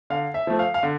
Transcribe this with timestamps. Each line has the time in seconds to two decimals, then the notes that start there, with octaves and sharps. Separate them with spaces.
0.10 D3 F5
0.34 E5
0.47 F3 A3
0.59 F5
0.74 F5
0.83 D3